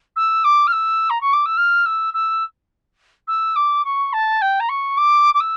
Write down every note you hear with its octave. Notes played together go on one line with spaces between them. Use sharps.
E6
D6
F6
E6
A#5
C#6
D6
E6
F6
E6
E6
E6
D6
C#6
A5
G5
A#5
C#6
D6
D6
E6